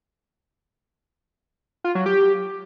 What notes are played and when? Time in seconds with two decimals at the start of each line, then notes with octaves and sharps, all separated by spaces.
1.84 F4
1.95 F#3
2.06 G4